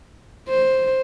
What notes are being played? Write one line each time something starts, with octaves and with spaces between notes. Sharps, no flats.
C5